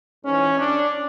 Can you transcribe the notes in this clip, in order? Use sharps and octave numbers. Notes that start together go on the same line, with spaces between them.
G#2 E3 C#4
D4